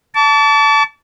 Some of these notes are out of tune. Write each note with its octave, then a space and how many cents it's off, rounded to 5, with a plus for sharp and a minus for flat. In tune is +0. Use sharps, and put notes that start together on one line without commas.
A5 +0 D6 -45